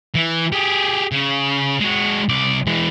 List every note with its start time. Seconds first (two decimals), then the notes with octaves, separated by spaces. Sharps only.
0.15 E3
0.52 G4 G#4
1.12 C#3
1.80 G#3 F#4
2.29 C2 D5
2.67 E3 G#3